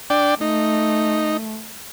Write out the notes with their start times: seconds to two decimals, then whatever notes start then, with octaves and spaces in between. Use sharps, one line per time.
0.10 D4 D5 G5
0.41 A3 D#4